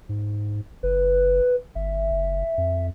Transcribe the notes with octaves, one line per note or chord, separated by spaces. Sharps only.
G#2
F#1 B4
G1 E5
F#1
F2